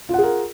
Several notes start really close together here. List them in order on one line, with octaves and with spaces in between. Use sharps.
F4 F#5 G#4 A#4